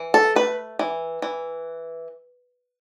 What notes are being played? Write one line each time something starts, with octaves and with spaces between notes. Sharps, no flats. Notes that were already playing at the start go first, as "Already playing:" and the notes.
Already playing: E3
A4
A3 B4
E3
E3